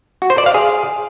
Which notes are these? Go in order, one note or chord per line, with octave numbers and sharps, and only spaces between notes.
F#4
C5
D5
F5
G#4